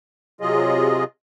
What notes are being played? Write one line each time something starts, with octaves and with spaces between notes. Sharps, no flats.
C3 F#3 F4 G#4 D#5